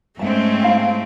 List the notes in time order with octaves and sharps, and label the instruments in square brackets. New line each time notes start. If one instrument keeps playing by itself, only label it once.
[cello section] G#2 C4 C#4 [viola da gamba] A3 [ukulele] E5 A5
[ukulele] E4 F5 A5